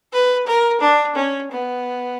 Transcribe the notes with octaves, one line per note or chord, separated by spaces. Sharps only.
B4
A#4
D4
C#4
B3